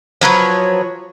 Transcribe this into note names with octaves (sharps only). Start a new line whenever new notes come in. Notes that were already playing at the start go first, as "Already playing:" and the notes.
F3 F#3 B4 C#5